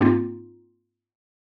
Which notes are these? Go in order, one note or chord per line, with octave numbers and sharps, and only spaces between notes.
G#2 A#3 C4 D#4 F4